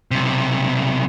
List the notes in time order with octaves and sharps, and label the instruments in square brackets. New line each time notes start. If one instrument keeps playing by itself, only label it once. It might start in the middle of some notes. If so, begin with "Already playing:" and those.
[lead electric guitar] B1 C3